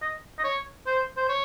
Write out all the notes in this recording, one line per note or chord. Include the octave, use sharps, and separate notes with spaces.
D#5
D#5
C#5
C5
C5
C#5